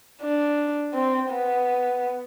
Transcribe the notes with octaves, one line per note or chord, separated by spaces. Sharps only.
D4
C4
B3